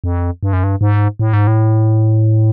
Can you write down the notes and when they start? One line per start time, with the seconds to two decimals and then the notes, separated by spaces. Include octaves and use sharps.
0.04 F2
0.43 G2
0.53 F#2
0.64 G2
0.81 G#2
1.20 A2
1.33 G#2
1.47 A2